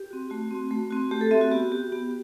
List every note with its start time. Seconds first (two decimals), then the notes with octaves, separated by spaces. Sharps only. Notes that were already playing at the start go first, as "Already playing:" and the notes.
Already playing: G4
0.11 C4 F#4
0.30 A3 F#4
0.51 C4 F#4
0.71 A3
0.90 C4 F#4
1.11 A3 G4
1.21 A4
1.31 C4 F#4 E5
1.41 F#4
1.51 B3 G4
1.72 F#4 G4
1.92 B3 G4